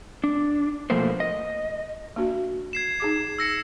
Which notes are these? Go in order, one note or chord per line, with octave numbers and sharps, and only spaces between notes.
D4
B2 F3 A3 A#3 C5
D#5
A#3 D4 F#4
G#6 C7 E7
D#4 G#4 D6
E6 A#6 C#7